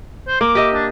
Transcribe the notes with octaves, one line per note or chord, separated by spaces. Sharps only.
C5
A#3 D6
G4 D#5 E5
D4